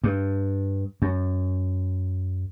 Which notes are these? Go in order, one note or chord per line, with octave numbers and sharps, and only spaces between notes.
G2
F#2